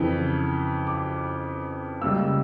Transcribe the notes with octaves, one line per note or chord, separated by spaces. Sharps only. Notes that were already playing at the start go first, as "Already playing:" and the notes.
Already playing: F2 C#3 E3
D6
C#2 C#3 G3 A#3 E6